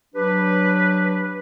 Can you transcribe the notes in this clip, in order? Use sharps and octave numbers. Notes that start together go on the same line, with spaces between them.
F#3 D4 G4 B4